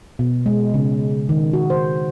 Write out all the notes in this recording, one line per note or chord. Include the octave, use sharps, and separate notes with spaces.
B2
G#3
C#3
D#3
F#4
C5